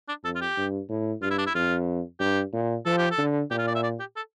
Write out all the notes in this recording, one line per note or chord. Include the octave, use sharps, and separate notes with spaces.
D4
F2 A4
F4
G4
G2
A2
G2 F4
E4
D4
E4
F2 F4
G2 G4
A#2
F3 A4
G4
A4
D3
A#2 G4
F4
D5
E5
D5
G4
A4